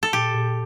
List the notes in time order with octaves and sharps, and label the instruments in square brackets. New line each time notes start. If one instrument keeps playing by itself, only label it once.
[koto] A4
[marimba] A#2 [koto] G4
[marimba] A#2